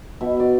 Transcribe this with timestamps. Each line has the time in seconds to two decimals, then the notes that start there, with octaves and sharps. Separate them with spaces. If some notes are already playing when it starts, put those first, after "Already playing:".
0.21 B2 E5
0.40 D5